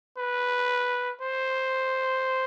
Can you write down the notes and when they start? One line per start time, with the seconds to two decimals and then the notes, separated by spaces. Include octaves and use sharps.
0.18 B4
1.21 C5